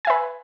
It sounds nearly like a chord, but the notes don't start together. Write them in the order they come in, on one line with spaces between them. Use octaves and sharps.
G#5 E5 B4